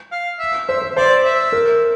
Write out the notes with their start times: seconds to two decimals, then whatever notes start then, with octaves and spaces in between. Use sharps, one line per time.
0.12 F5
0.39 E5
0.68 C5 E5
0.82 C5
0.96 C5 D5
1.24 E5
1.52 A#4